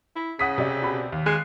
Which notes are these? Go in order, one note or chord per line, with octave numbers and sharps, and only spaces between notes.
E4
C#3 F#5 D#6 B6
C3 D5
B2 B5
D#2
G#3 F#6 C7